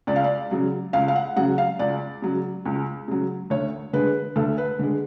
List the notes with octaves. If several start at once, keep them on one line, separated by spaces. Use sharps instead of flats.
C#2 D5
F5
D5
C#3 F#3
C#2 F5
F5
F#5
C#3 F#3 F#5
F5
C#2 D5
C#3 F#3
C#2
C#3 F#3
D2 C#5
D3 G#3 B4
D2 A4
B4
D3 G#3